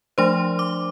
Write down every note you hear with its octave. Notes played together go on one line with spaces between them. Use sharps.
F3 A3 D4 C5 C6
D6